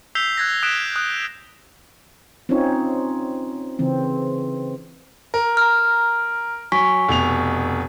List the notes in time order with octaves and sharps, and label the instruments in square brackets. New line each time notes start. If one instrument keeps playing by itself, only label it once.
[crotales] E6 G6 B6 C7 F7 G7
F#6 G#6 A#6
D#6 F#6 G#6 B6 D7 E7
D#6 F#6
[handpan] C4 C#4 D#4 F4 C#5
C#3 E3 C4
[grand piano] A#4
[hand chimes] A#5 F6
[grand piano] F#3 [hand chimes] G#5 C#6 B6
[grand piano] F1 B2 F7